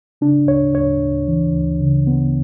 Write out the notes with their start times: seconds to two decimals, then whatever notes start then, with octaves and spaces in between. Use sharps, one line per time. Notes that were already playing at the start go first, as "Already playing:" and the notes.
0.21 C#3 D4
0.47 D2 C#5
0.75 D2 C#5
1.01 D2
1.28 E3
1.53 D2
1.80 C#3
2.07 B3